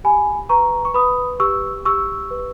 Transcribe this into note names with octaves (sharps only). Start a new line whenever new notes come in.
G4 G#5 B5
B4 A#5 C#6
C#6
B4 B5 D#6
G4 C#6 E6
G4 C#6 E6
B4